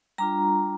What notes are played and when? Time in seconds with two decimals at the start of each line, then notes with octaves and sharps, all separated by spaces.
0.18 G3 D4 F4 A#5